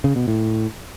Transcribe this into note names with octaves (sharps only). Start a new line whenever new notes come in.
C#3
B2
A2